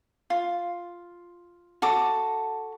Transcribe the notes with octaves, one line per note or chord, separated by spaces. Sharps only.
F4
F#4 A4 D6